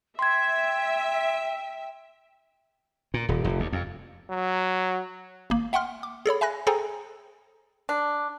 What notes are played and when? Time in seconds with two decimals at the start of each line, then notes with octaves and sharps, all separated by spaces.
0.19 E5 G5 C6 G#6
3.14 A#2
3.29 D#1
3.44 F1
3.60 D#2
3.73 F2
4.30 F#3
5.50 G#1 A#3
5.73 E5 F#5 G5 C6 F6
6.03 D6
6.26 G#4 A4 C#5 B5
6.41 E5 G#5 B5 F#6 A#6
6.67 G#4 A4 C5 G5 G#5 A#5
7.89 D4